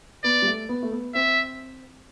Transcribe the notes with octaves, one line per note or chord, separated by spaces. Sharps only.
B3 D5
G3
A3
B3
A3
B3
C4 E5